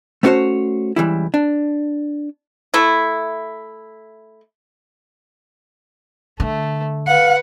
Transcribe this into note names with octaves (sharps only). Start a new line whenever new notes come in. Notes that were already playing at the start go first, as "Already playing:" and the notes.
A3 B3 C#4 F#4 C5 C#5
C#2 E3 G3 E4
D4
A3 E4
D3 A3
B4 F5 F#5